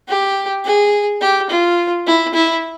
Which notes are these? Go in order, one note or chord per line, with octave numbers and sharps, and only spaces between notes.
G4
G#4
G4
F4
E4
E4